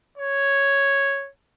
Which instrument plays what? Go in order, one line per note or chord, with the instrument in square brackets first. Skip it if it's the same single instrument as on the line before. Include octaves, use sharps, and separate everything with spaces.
[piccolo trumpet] C#5